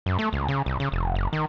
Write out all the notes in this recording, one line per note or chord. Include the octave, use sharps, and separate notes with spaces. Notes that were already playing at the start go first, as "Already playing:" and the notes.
F#2
A3
C#2
C#3
C2
C#3
F1
F#1
D#3